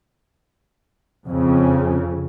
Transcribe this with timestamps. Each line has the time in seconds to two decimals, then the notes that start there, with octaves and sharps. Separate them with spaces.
1.28 F2 C#3